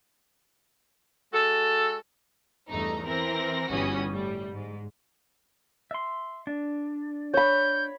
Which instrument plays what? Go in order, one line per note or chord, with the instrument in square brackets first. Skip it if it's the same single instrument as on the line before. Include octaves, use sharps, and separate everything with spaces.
[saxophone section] G#3 F#4 A4
[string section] E2 G2 A3 D#4 A#5
E3 C4 A#4 A#6
G1 E3 G3 C#4 F#4 D#6
A2 G3
G#2
[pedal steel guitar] E5 C6
D4
[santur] C#5 B5 [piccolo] G6